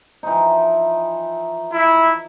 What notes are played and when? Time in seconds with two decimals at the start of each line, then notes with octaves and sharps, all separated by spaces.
0.23 E3 F3 D#4
1.73 E4